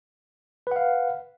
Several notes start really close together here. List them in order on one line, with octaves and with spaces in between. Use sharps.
B4 F#5 F5